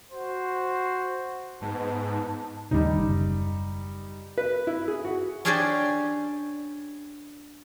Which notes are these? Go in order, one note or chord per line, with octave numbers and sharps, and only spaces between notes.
F#4 C5
G#2 B3 A5
D#2 A2 C#3 G3 D#4
F#1
B4
E4
G#4
F#4
C#4 D4 G4 G#4 C5 D5